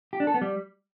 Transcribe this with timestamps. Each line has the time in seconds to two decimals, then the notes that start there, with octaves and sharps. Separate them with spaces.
0.13 G4
0.20 D4
0.27 A4
0.34 B3
0.42 G3